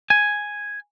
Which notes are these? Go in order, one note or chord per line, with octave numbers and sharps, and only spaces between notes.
G#5